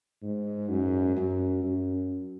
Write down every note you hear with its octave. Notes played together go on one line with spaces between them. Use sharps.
G#2
F#2
F#2
F#2